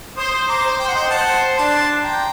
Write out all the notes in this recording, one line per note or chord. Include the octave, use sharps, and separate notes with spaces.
C5 C6 D#6
A#5 D6
C5
G5
F#5
D#5 G5
C5 F#5 A5
D4 A5 C6
G5 A#5